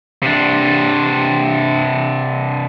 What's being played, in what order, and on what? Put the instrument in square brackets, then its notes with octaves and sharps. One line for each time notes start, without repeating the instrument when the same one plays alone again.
[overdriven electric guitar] C3 D4